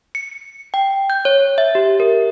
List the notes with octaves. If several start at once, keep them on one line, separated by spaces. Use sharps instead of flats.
C#7
G5
G6
C#5
E5
G4
A#4